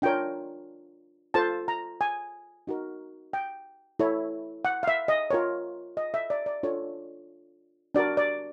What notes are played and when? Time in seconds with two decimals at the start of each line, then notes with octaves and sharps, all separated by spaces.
0.02 D4 F4 A#4 C#5 G5
1.34 F4 A4 C5 A5
1.68 A#5
2.01 G#5
2.67 D#4 F#4 A#4
3.33 G5
3.99 E4 A4 C#5
4.65 F#5
4.83 F5
4.88 E5
5.08 D#5
5.31 F4 A#4 C#5
5.97 D#5
6.14 E5
6.30 D5
6.46 D5
6.63 D4 F4 A4 C#5
7.95 D4 F#4 A#4 D5
8.17 D5